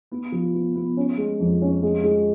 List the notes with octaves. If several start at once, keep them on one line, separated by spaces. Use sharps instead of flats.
B3
F3
B3
B3
C#4
G#3
F2
C#4
G#3
G#3